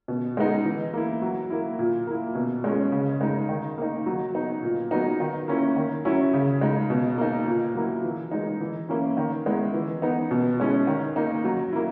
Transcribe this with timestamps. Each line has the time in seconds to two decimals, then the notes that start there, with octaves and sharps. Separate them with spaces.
0.08 B2
0.37 G#3 B3 D#4
0.65 E3
0.94 A#3 E4
1.22 F#3
1.50 A#3 E4
1.79 A#2
2.07 A#3 E4
2.35 B2
2.64 G#3 C#4
2.92 C#3
3.21 G#3 D#4
3.49 D#3
3.78 A#3 D#4
4.06 F#3
4.34 B3 D#4
4.63 A#2
4.91 F#3 B3 D#4
5.20 D#3
5.48 A#3 C#4 E4
5.76 D#3
6.05 F#3 C#4 E4
6.34 C#3
6.61 G#3 D#4
6.90 B2
7.18 A#3 D#4
7.47 A#2
7.75 F#3 A#3 E4
8.03 E3
8.31 G#3 D#4
8.61 E3
8.89 A#3 C#4 E4
9.17 D#3
9.46 G#3 B3 E4
9.74 E3
10.02 B3 D#4
10.31 B2
10.60 G#3 C#4 E4
10.87 D#3
11.16 A#3 D#4
11.44 F#3
11.73 A#3 E4